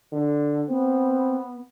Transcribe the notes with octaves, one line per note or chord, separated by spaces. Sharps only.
D3
B3 C4